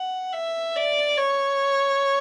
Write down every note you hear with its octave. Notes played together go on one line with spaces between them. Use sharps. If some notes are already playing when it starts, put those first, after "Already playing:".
Already playing: F#5
E5
D5
C#5